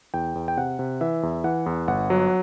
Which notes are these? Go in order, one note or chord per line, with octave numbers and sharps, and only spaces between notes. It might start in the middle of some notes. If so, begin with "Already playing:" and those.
E2 G5
E2
G5
C3 F#5
C3
E3 E5
E2
E3 F#5
E2
G1 F#5
F#3